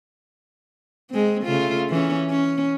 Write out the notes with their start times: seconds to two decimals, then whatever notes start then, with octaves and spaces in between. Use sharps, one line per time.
1.11 G#3 C4
1.43 C#3 A3 F4
1.90 E3 C#4
2.30 C#4